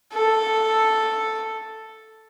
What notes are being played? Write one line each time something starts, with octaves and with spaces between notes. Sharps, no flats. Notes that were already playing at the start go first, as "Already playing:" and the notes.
A4